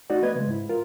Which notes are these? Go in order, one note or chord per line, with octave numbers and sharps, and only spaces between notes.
A3 D#4 F#4 D5
A3 B3 B4 D#5 G#6
C#3 G#3
G#2 E4
F4 A#4